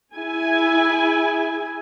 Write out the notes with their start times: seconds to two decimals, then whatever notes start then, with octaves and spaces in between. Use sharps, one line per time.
0.15 E4 G#4 G#5